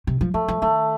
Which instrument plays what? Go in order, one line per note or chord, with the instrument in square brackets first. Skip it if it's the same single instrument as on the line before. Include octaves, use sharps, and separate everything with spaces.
[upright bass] C3
F3
[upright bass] F3 [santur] A3
[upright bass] F3
[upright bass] D#3 [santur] A3